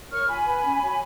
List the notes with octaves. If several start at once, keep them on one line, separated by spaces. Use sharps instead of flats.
A#4 C#5 C#6 F6
F4 G#5 B5
B4
C#4
F#4 C#5